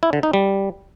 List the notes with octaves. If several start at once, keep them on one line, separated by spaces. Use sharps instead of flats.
E4
D3
D#4
G3